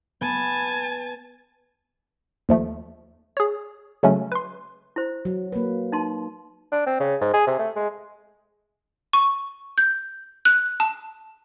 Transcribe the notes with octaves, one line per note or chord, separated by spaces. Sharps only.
B3 G#5 A5
D#2 F3 A3
G#4 C#5
C#3 F#3 G#3 A3 C#4
B4 C6
E4 C5
F#3
A#3 B4
D#4 A5 C6
D4
C4
C#3
G#2
G#4
C3
A3
G#3
C#6
G6
F#6
A5